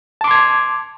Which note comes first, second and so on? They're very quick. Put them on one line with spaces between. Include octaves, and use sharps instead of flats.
A5 D6 C6 G#6